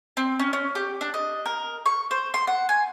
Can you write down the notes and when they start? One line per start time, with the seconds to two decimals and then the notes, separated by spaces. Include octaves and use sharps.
0.17 C4
0.39 C#4
0.53 C#4
0.75 G4
1.01 D4
1.14 D#5
1.46 A#4
1.86 C#6
2.11 C5
2.34 C6
2.47 F#5
2.69 G#5